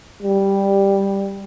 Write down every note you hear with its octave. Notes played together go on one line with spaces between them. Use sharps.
G3